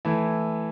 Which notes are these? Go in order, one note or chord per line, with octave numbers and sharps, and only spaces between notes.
E3 A3 E4